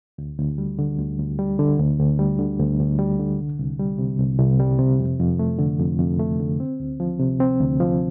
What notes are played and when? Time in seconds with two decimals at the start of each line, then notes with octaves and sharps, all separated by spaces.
0.18 D2
0.39 D2
0.58 G3
0.79 D3
0.98 D2
1.19 D2
1.39 G3
1.59 D3
1.79 D2
1.99 D2
2.19 G3
2.39 D3
2.59 D2
2.79 D2
2.99 G3
3.19 D3
3.39 C2
3.59 C2
3.79 G3
3.99 C3
4.19 C2
4.39 C2
4.59 G3
4.79 C3
4.99 F2
5.19 F2
5.39 A3
5.59 D3
5.79 F2
5.99 F2
6.19 A3
6.40 D3
6.60 C4
6.80 D2
7.00 F3
7.20 C3
7.40 C4
7.60 D2
7.80 F3